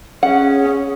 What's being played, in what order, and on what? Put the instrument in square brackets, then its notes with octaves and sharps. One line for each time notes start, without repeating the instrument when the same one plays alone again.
[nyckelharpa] C#4 [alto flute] G#4 [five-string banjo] F#5